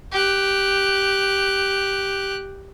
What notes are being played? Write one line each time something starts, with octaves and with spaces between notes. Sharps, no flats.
G4 F#6